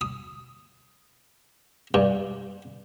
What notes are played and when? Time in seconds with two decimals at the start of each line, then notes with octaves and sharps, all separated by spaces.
0.01 D#6
1.94 G2